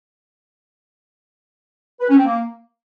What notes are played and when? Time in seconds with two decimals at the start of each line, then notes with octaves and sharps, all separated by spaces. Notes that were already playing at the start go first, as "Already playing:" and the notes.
2.01 B4
2.09 C#4
2.17 C4
2.25 A#3